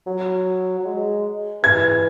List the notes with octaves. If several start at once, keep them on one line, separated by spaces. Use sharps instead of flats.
F#3
F#3
G#3
E3 G#6